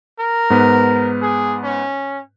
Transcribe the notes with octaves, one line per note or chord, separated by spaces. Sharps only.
A#4
G#2 B3 B4
G#4
C#4